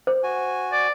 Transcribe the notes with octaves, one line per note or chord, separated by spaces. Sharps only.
C5
F#4 G#5
D5